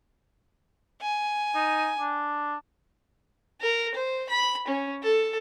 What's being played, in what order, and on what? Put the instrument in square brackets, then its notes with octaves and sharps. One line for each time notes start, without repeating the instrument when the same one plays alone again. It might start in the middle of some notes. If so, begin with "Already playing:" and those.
[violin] G#5
[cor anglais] D#4
D4
[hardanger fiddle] A#4
C5
B5
C#4
A4